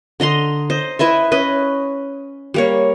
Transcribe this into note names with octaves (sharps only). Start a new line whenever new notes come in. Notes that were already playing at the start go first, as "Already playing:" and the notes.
D3 D#5 A#5 C6
C5 D#5
E4 B4 D#5 E5
C#4 B4 D#5
G3 A#3 C#5